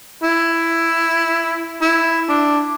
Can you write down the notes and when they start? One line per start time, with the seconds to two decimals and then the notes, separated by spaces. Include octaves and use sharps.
0.22 E4
1.81 E4
2.29 D4